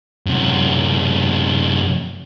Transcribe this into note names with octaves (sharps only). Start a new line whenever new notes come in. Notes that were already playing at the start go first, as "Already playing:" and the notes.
F#2 C3